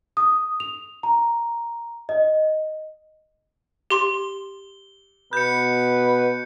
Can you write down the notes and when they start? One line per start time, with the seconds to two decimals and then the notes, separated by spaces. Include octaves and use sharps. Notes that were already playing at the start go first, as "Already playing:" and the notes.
0.17 D#6
0.60 F7
1.03 A#5
2.09 D#5
3.90 G4 C6 G7
5.33 B2 B4 G6 C#7